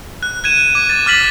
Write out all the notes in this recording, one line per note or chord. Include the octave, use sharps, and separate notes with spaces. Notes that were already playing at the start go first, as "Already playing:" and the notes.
F#6
F#6 G#6 D#7 E7
D6 D#7
A6
D6 F6 A6 B6 F#7